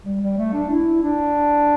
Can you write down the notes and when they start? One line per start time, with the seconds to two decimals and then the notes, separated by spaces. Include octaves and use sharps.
0.05 G3
0.21 G3
0.37 A3
0.53 D4
0.70 E4
1.02 D4